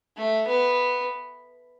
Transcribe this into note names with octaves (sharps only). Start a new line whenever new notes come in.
A3
B3